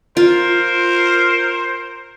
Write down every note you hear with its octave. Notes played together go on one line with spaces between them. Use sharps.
F4 A#4 C5